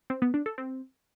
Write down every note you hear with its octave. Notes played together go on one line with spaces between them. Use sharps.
C4
B3
D4
A4
C4